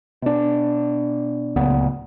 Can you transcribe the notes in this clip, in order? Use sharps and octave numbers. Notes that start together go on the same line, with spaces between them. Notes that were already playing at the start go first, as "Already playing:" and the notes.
B2 D4
D1 C#2 A#2 B3